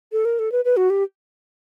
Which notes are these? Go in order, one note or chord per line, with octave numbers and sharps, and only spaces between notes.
A4
A#4
A4
B4
B4
F#4
G4